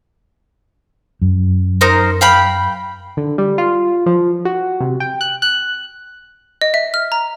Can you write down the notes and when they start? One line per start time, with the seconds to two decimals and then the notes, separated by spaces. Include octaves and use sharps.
1.22 F#2
1.81 D#4 A#4 C5
2.21 F5 G5 B5
3.17 D3
3.38 G3
3.58 F4
4.06 F3
4.45 F#4
4.80 C3
5.00 G5
5.21 F#6
5.42 F#6
6.61 D#5
6.74 E5
6.94 F6
7.12 A#5